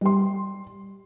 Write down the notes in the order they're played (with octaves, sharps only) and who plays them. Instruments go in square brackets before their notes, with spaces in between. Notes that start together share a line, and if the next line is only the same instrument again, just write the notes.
[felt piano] G3 C6